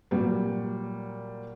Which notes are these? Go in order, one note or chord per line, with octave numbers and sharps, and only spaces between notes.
A#2 F#3 G3